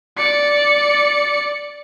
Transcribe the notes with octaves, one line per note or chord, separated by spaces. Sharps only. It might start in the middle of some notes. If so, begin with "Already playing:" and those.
D5 C#7